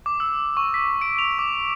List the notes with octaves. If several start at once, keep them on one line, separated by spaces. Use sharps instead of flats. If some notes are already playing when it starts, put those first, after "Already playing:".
D6
E6
C#6
B6
D7
F7
D6